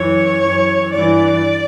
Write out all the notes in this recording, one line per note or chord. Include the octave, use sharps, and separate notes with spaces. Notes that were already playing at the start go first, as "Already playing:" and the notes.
Already playing: F#2 E3 C#5
F#2 E3
G2 E3 D5